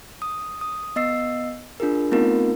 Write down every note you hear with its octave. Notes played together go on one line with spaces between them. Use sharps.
D#6
D#6
B3 D#5 E6 C7
D4 F4 G#4 A#4
A3 B3 C4 D#4 F4 A#4